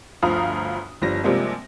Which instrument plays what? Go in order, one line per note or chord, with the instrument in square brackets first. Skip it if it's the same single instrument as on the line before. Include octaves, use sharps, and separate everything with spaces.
[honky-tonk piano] G1 D2 F3 F5 A#5 D#6
G1 F3 G3 A#6
C3 F3 G3 G#3 A#3 C4